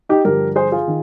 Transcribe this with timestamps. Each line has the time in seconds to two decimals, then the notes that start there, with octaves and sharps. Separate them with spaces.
0.09 D#4 G4
0.25 G2 D3 F3 G4 A#4
0.56 G#4 C5
0.72 F4 G#4
0.87 D#3